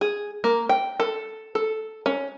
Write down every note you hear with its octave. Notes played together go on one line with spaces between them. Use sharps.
G#4
A#3
G5
A4
A4
C#4